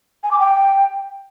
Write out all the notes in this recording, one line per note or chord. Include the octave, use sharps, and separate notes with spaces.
G#5
D6
G5